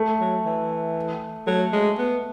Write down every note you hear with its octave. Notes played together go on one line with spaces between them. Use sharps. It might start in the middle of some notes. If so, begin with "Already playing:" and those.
Already playing: A3
F#3
E3
F#3 A3
G#3
B3